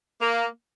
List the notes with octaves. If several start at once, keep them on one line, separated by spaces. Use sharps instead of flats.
A#3